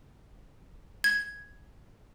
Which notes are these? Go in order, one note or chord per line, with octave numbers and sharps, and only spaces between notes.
G#6